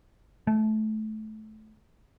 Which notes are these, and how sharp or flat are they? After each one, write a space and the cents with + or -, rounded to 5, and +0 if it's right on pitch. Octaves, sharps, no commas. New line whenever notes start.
A3 -20